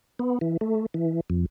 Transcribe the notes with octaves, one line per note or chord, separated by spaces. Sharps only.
B3
E3
A3
E3
F2